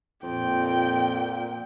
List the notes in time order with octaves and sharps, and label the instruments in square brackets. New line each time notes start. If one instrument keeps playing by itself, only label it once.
[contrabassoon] F2 [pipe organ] A#2 [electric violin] G5